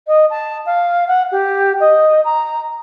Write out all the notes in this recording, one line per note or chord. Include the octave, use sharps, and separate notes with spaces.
D#5
A5
F5
F#5
G4
D#5
A#5